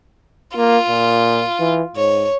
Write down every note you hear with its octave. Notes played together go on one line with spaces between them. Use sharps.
A#3 F4
A#2
E3
G#2 C#5